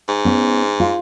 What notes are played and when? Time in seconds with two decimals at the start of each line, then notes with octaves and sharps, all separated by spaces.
0.08 G#2
0.25 B3 C#4
0.80 F4